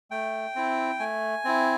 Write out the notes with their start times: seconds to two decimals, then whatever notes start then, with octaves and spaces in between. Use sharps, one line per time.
0.11 A3 G5
0.55 C4 E4
1.00 A3 G#5
1.45 C4 E4